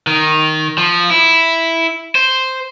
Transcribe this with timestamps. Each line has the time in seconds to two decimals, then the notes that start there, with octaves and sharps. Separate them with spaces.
0.07 D#3
0.78 F3
1.10 E4
2.15 C5